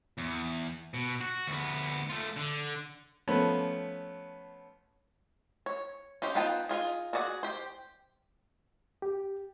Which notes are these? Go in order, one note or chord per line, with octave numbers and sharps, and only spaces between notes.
E2
B2
F#4
D2 B3
A3 F4
D3
F3 A3 B3 C#4 C#5
C#5
C#4 D#4 G4 C5
B3 D#4 F4 G5 A5
D#4 F4 G#4
F#4 G#4 D5 D#5 F#5
G4 C5
G4